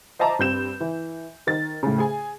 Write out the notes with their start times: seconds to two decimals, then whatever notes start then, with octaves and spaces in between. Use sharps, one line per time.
0.19 C5 D#5 E5 A5 A#5 D6
0.39 G2 C4 G6 E7
0.81 E3
1.47 D#3 A6
1.83 A2 C#3
1.98 G#4 G#5